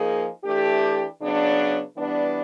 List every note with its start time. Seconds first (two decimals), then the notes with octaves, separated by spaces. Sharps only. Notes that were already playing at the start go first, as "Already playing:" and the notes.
Already playing: F3 A#3 D#4 G#4
0.43 E3 A3 D4 G4
1.19 C#3 F#3 B3 D4
1.96 E3 G3 B3 D4